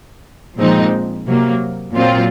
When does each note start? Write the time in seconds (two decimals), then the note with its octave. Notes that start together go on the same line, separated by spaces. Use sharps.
0.58 A#2 F3 G#3 C4 D#4
1.26 C3 F#3 A#3
1.95 A#2 F#3 C4 F4